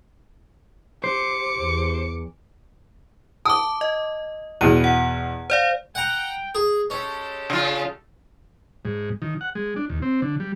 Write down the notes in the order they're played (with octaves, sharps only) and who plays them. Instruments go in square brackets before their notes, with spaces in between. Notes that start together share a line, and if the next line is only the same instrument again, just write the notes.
[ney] G4 [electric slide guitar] C5 [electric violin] D6 C#7
[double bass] E2
[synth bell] A5 D6 [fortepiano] D#6
[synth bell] D#5
[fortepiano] E2 B2 [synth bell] D#7
[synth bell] F#5
C5 D5 F5
[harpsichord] F#5 A#5 [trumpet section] G5
[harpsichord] G#4
[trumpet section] G#3 G4 A4 [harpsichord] C#4
[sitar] C#3 F4
[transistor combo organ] G#2
D#3
F#5
G#3
D4
D#2
C4
D3
G3